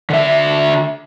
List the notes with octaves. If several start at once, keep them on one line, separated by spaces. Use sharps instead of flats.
D3 E5